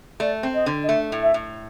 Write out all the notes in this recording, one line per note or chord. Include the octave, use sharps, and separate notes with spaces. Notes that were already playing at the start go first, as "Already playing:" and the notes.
A3 D5
C4
D#5
D3
D#5
A3 E5
A2
E5
A2